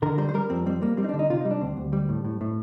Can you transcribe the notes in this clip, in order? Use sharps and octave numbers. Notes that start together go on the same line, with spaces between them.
D3 A#4
G3 C5
C5
G3 A#4
F2 C4
G3 C4
G3 A#3
G3 C4
D#4
D3 D4
D#4
C3 F4
G3 D#4
D4
D2 C4
D2
G3
A2
A2
A2